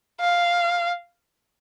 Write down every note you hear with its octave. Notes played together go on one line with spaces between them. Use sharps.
F5